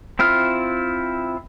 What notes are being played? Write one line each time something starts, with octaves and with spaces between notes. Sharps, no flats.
C4 E4 F4 F6